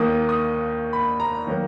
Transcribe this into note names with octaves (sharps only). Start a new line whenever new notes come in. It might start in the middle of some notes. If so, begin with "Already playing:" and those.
Already playing: D#2 D#3 A#3 D#6
D#6
B5
A#5
D#3 F#3 A#3